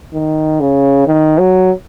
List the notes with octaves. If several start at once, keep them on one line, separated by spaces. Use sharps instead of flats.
D#3
C#3
D#3
F#3